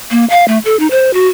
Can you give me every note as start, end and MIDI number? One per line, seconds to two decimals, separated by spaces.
0.11 0.25 58
0.30 0.45 77
0.48 0.58 57
0.65 0.78 69
0.79 0.87 63
0.91 1.11 72
1.14 1.28 66